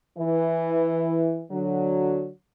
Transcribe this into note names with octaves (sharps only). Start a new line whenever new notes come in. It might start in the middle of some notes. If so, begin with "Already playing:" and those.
E3
D3 F#3